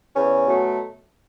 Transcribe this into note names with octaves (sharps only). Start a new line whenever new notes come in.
E2 C#4
B2 F#3 A3